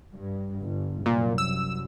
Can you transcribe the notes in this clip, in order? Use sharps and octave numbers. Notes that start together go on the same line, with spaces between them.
G2
G1 G2
C2 F#2 A#2
E6